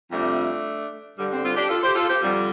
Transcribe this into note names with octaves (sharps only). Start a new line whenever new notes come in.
F2 C3 G3 A3 D4
G2 D3 G3
G3 C4
C4 F4
D4 G4
F4 A4
G4 C5
F4 A4
G4 C5
F2 D3 G3